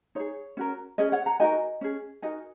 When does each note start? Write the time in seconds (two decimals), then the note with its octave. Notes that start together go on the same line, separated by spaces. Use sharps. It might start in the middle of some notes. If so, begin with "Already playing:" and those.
0.15 D#4 G#4 C#5
0.57 C#4 F#4 A#4
0.98 C#4 G#4 D#5
1.12 C#5 F#5
1.26 F#5 A#5
1.40 D#4 F#4 A#4 D#5 G#5
1.81 C#4 G#4
2.22 D#4 F#4 A#4 D#5 G#5